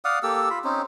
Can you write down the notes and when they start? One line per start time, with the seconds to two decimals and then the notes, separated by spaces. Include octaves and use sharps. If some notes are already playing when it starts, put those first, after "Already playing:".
0.05 D5 F5 F#5 D#6
0.23 A#3 G4 A4 E6
0.50 F4 B5
0.64 C4 C#4 D#4